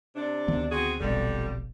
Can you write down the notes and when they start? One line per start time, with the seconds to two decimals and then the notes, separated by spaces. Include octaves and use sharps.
0.15 C3 D4
0.48 D2 D#3 B3
0.70 C4 F#4 G#4
1.00 E1 A#1 F2 B2 D3 G3